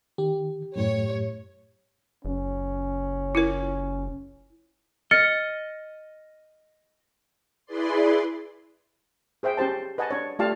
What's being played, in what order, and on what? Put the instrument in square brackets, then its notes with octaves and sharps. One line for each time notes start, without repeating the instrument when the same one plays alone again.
[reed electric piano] D#3 [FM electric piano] G4
[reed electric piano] F#2 A2 [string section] C#5
[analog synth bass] F#1 [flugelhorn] C#4
[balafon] E4 F4 A#4
[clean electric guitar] D#5 [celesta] F6 A6 C#7
[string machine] E4 G#4 B4 D5 C6
[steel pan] G#4 C5 E5 G5
C#4 G4 C5 A5
B4 D#5 F#5 G#5 A5
D4 C#5
A3 F4 G4 D5 F5 A5